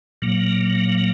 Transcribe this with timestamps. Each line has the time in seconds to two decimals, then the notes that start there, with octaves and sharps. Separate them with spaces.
0.22 A#2 F#3 A#3